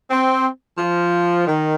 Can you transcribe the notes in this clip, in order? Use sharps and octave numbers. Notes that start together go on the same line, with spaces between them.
C4
F3
D#3